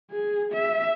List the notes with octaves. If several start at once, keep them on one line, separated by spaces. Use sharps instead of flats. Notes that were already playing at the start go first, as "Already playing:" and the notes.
G#4
E5